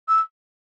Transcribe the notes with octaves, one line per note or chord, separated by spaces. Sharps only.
E6